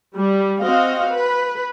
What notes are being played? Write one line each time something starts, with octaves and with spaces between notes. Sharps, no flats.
G3
C4 F#4 D#5 F5
B4